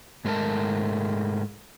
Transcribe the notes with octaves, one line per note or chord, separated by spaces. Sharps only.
G#2 G#3 A3 B3 A#4 A5